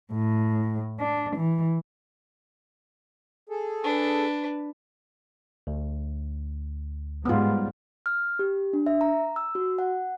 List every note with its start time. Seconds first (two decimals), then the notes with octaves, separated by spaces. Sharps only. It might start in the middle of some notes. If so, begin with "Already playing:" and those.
0.13 A2
0.99 D4
1.36 E3
3.49 G#4 A4
3.84 D4 B4
5.67 D2
7.25 G#2 G3 B3 F4
8.06 F6
8.39 G4
8.73 D4
8.86 E5
9.01 A#5
9.36 E6
9.55 F#4
9.78 F#5